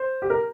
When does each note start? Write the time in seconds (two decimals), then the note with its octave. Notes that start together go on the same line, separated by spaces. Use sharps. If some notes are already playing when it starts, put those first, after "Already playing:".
Already playing: C5
0.22 G4
0.30 A#4